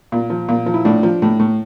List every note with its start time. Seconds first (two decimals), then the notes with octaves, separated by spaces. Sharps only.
0.12 A#2
0.30 F3
0.49 A#2
0.66 F3
0.74 E4
0.85 A2 D4
1.03 F3
1.22 A2
1.39 A2